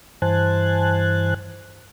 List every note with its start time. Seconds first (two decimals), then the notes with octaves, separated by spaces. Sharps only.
0.22 G2 E3 C5 G#5 A5 F#6